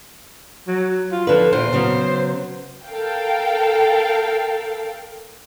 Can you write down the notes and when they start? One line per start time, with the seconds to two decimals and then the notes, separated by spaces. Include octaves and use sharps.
0.68 F#3
1.12 F4
1.27 D3 F3 B4
1.53 E2 A#2 C5
1.73 C#3 F#3 B3
2.87 A4 A#4 F5 G5